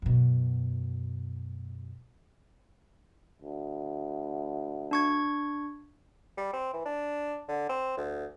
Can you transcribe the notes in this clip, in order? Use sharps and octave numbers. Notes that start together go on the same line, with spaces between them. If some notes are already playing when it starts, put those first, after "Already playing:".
F#2 B2
D2
D4 C#6 G#6
G3
C4
E3
D4
D3
C4
D2